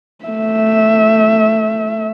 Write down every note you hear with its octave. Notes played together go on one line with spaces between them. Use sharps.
A3 E5